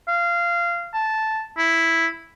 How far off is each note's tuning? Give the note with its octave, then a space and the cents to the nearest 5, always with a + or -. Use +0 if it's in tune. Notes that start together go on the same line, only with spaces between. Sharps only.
F5 -20
A5 -5
E4 +0